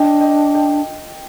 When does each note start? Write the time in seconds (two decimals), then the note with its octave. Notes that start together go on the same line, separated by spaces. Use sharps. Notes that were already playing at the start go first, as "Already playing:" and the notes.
Already playing: D4 D#5 G5
0.21 D#5 G5
0.55 D#5 G5